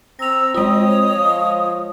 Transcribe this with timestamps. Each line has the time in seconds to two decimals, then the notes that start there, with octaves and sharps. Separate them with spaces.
0.19 C4 A#5 E6 A#6 F7
0.54 G#3 C4 F4 C#5 D#5 D#6
1.16 F3